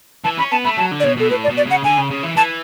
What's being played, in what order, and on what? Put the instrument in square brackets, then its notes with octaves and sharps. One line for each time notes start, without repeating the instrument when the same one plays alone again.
[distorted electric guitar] E3 [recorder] A5
[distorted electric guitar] C#4 [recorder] B5
[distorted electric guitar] B3 [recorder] A5
[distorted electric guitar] A3 [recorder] B5
[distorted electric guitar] F#3 [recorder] A5
[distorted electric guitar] D3
[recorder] D5
[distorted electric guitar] B2 [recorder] C#5
[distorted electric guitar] B2 [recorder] A4
[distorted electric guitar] A2 [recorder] B4
[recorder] D5
[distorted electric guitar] B2
[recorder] D5
[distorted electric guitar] C#3 [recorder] F#5
[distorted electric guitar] D3 [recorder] G#5
[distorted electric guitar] C#3
C#3
E3
[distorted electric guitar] E3 [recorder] A5